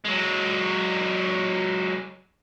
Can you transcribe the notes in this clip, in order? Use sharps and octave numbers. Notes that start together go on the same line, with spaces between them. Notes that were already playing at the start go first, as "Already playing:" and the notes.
F#3 G#3